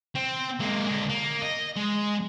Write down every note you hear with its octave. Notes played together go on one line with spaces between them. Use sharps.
C4
G#3 A#3
D3 G#3
A#3
D#5
G#3